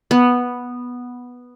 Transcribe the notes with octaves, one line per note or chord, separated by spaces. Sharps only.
B3